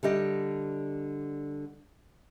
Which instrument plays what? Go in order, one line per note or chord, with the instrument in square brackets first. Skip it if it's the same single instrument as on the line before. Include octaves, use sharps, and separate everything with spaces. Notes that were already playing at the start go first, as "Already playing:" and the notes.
[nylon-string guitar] D3 G3 G4 D#5